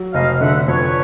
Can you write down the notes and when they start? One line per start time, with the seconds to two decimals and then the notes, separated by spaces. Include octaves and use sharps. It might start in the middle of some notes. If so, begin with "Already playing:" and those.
Already playing: F#3
0.13 F1 D#5 F5
0.41 D3 E5 F#5
0.68 F2 B4 C#5